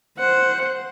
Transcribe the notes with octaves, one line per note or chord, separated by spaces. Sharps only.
C5 F#5